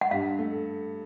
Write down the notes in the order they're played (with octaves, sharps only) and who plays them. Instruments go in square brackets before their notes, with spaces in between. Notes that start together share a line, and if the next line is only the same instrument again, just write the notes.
[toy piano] F#5
[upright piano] G2 [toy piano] F5
[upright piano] A3